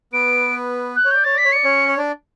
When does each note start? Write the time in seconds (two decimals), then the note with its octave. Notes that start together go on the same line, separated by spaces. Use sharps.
0.13 B3 B4 D7
0.96 F#6
1.05 C#5
1.11 D5 G6
1.24 C#5 A6
1.34 D5 B6
1.45 C#5
1.52 D5 C#7
1.64 C#4 C#5
1.88 C#5
1.98 D4 D5